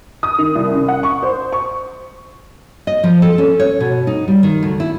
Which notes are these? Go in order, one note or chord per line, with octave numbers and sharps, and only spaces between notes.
D#6
D#3
C2
C#4
F#5
C#6
C5
C#6
D#5
F3
A4
C#4
C#5
B2
D#4
G3
D#3
D2
E4